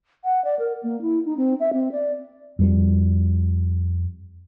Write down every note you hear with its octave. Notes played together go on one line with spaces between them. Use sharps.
F#5
D5
A#4
A#3
E4
D#4
C4
E5
C4
D5
F2 G3